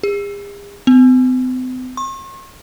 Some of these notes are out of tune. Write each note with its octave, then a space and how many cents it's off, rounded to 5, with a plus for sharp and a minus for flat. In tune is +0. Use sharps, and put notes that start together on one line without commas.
G#4 -45
C4 -45
C#6 -45